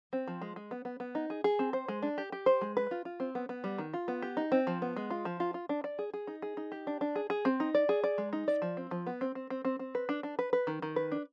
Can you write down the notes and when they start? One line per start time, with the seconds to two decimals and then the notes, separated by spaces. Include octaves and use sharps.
0.13 C4
0.28 F3
0.42 G#3
0.56 G#3
0.71 B3
0.85 B3
1.00 B3
1.15 D#4
1.30 G#4
1.44 G#4
1.59 C4
1.73 C5
1.88 G#3
2.02 D4
2.18 G4
2.32 G4
2.46 C5
2.61 G#3
2.77 B4
2.91 F4
3.05 F4
3.20 C4
3.35 B3
3.49 B3
3.64 G3
3.78 D#3
3.94 F4
4.08 B3
4.22 G4
4.37 D#4
4.52 C4
4.67 F3
4.82 B3
4.97 G#3
5.10 F4
5.25 F3
5.40 F4
5.54 F4
5.69 D4
5.84 D5
5.99 G#4
6.14 G#4
6.27 D#4
6.42 G#4
6.57 D#4
6.72 G4
6.87 D4
7.01 D4
7.16 G#4
7.30 G#4
7.45 C4
7.60 D#4
7.75 D5
7.89 G#4
8.04 D5
8.18 G#3
8.33 D#4
8.48 D5
8.62 F3
8.77 C4
8.91 F3
9.07 B3
9.21 C4
9.35 C4
9.50 C4
9.65 C4
9.79 C4
9.95 B4
10.09 D4
10.23 D4
10.39 B4
10.53 B4
10.67 D#3
10.82 D#3
10.96 B4
11.12 D4